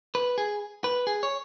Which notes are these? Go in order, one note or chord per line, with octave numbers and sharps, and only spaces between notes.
B4
G#4
B4
G#4
C#5